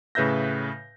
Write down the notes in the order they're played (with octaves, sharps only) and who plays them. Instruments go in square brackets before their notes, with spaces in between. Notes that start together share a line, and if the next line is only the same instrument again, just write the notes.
[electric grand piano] A2 C#3 B4 E5 G6 A#6